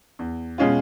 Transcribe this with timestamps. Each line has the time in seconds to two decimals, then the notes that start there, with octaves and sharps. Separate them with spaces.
0.19 E2
0.58 B2 G#3 C#4 F4